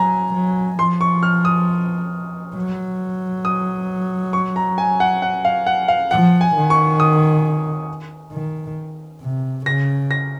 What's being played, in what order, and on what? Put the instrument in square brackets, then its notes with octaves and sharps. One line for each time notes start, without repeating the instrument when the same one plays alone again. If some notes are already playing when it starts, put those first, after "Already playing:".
Already playing: [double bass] F#3 [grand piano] G#5 A#5
[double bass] F#3
[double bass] F3 [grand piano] C6
[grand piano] C#6
F6
D#6
[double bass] F#3
[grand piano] D#6
C#6
A#5
G#5
F#5
F#5
F5
F#5
F5
[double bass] F3 [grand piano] F#5
[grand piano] G#5
[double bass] D#3
[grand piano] C#6
D#6
[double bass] D#3
C3
[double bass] C#3 [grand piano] A#6
[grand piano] A#6